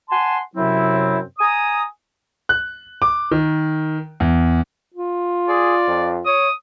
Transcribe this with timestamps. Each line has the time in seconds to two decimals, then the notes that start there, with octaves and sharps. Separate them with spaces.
0.10 F#5 G#5 A5 C6
0.56 F#2 C3 F#3 C4 E4
1.39 G#5 A#5 D#6
2.49 F#6
3.02 D6
3.31 D#3
4.20 E2
4.94 F4
5.49 G#4 D5
5.88 F2
6.26 C#5 D#6